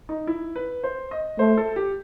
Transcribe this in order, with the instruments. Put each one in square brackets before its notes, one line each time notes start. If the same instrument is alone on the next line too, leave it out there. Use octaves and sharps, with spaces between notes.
[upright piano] D#4
E4
B4
C5
D#5
[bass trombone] A3 [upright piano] C5
[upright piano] A4
G4